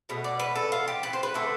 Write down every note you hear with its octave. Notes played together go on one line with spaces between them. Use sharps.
B2 A3
D5
B4
A4
F4
G4
B4
C5
B4
D3 A3 A4